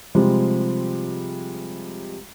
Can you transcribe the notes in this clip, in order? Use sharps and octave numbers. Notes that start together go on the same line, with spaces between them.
C3 F3 G3 G#3